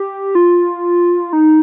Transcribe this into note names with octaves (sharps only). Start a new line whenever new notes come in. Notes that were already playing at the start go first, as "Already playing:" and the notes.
Already playing: G4
F4
D#4